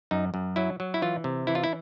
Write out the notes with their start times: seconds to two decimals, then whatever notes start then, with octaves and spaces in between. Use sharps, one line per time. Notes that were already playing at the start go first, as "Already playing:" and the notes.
0.11 F#2 D#4
0.34 F#2
0.56 F#3 E4
0.80 F#3
0.94 E4
1.02 E3 F4
1.24 C3
1.47 E3 E4
1.55 F4
1.64 E4